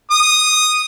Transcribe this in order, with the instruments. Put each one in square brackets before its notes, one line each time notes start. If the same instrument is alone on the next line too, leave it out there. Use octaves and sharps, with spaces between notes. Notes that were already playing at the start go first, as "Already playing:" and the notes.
[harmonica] D#6